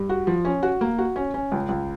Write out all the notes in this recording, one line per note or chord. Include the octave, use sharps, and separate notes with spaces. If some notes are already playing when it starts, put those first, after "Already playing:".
Already playing: G2
F#4
F3
C#4
F#4
A#3
F#4
C#4
C#4
C#2
C#2